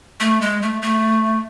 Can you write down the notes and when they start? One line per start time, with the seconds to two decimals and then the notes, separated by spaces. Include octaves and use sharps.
0.20 A3
0.41 G#3
0.62 A3
0.82 A3